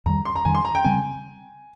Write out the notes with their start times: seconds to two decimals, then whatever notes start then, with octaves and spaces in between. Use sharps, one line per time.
0.06 F2 D#3 G3 A#5
0.25 C6
0.36 A#5
0.45 F2 D#3 G3 G#5
0.55 C6
0.65 A#5
0.75 G5
0.84 C#3 G3 C4 G#5